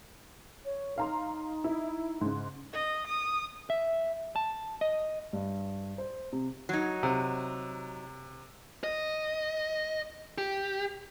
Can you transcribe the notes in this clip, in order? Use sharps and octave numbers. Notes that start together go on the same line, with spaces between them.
C#5
D#4 F5 A#5 C6
E4
G#2 C#3
D#5
D#6
E5
A5
D#5
G2
C5
C3
F#3 D#4
C3
D#5
G4